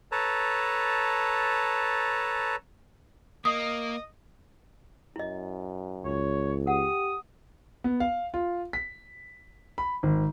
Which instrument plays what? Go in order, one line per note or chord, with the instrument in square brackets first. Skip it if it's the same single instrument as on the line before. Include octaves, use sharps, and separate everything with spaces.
[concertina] A4 B4 C#5 A5 A#5
[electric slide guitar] A#3 [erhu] D#5 [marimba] D#6
[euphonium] F#2 [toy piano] E4 D#5
[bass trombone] C#2 [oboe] C#5
[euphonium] G4 [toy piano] F#5 [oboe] D#6
[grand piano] B3
F5
F4
B6
B5
G#1